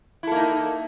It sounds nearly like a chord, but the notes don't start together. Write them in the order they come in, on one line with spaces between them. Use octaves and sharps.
E4 A4 A#3 D#4